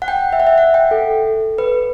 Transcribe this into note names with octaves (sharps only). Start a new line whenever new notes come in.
F#5
G5
E5
F#5
E5
F#5
G5
A4
B4